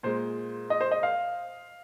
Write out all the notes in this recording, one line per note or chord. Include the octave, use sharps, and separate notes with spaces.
A#2 G#3 C5
D#5
C5
D#5
F5